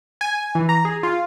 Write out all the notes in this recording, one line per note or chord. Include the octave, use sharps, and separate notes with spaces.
G#5
E3
A#5
G#4
F4